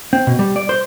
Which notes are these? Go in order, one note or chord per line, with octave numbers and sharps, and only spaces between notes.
C4
B2
G3
D5
C5